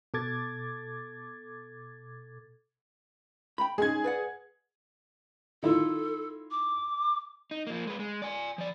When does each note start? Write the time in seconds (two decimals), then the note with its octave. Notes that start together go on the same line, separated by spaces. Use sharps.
0.14 B2 A4 D6 G#6 A6
3.58 G5 A#5 B5
3.78 G#3 C#4 D#4 G#4 G#6
4.04 B4 D5 F#5
5.63 D#3 E4 F4 A4
6.51 D6
7.51 D#4
7.67 F3 A#3
7.87 G#3 B4
8.00 G#3
8.22 D5 G#5
8.58 F3 D5